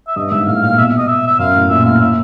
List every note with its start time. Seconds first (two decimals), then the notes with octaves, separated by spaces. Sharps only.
0.08 E5
0.16 G2 D#5
0.31 G#2 E5
0.47 A2 F5
0.62 A#2 F5
0.77 B2 E5
0.98 D#5
1.08 E5
1.27 E5
1.39 F#2 F5
1.55 A2
1.70 A#2 E5
1.85 A2 F5
2.00 A#2 E5